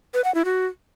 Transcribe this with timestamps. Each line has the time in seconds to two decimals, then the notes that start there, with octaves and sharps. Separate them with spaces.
0.14 B4
0.24 F#5
0.35 E4
0.45 F#4